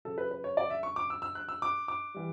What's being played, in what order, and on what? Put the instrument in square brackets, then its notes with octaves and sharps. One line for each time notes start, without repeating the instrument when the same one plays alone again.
[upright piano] C#3 F#3 A4
B4
B4
C#5
D5
E5
C#6
D6
E6
E6
F#6
E6
D6
D6
E3 G3